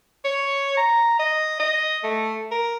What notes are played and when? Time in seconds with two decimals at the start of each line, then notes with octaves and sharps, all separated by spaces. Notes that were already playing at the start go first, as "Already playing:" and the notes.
0.25 C#5
0.77 A#5
1.19 D#5
1.59 D#5
2.04 A3
2.51 A#4